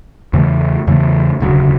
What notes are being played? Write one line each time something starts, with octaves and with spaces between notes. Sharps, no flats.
E2 C#3 E3 A3
E2 C#3 E3 A3
E1 D2 C#3 F#3